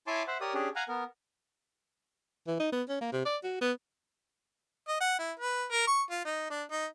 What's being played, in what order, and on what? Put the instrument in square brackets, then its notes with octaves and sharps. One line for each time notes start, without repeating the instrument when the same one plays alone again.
[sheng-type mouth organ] E4 C#5 G#5 A5 C6 D6
C5 E5 F#5
G4 A#4 C#5 D5 D#6
C#4 D4 G4 G#4
F5 F#5 G#5 A#5
B3 A#4
[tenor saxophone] E3
D#4
B3
C#4
A#3
C3
D5
F#4
B3
[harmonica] D#5
F#5
E4
B4
A#4
C#6
F4
D#4
D4
D#4